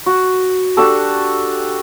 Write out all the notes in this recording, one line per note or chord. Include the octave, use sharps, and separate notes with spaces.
F#4
D4 F#4 G4 A4